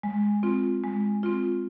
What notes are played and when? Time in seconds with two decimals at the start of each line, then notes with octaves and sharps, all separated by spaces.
0.03 G#3
0.43 C4 F4
0.83 G#3
1.23 C4 F4